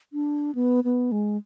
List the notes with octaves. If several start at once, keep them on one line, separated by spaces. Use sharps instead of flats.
D4
B3
B3
G#3